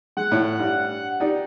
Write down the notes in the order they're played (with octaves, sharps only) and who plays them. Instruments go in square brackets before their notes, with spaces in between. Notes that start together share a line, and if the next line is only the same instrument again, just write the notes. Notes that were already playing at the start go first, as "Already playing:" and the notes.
[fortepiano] G#3 [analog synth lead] F#5
[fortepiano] A2
G2
D#4 G4 D5